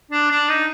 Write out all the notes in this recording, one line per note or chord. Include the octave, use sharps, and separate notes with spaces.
D4
D4
D#4